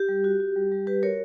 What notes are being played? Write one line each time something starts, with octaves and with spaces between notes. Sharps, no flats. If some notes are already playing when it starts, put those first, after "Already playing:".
Already playing: G4
G3
F#4
F#4
G3
G3
G3 G4 B4
F#4 A#4 C#5